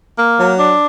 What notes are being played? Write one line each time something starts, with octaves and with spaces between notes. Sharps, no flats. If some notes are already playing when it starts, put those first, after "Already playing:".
A#3
F#3
D4